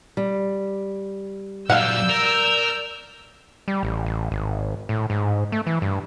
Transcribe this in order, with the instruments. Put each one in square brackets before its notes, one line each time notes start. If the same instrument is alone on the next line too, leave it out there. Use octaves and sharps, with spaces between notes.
[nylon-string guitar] G3
[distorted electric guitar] A#2 F#3 [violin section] D5 E6 G6 [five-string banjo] F5 F#5
[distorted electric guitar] A#4
[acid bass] G3
A1
A1
G#1
A2
G#2
A3
E3
G2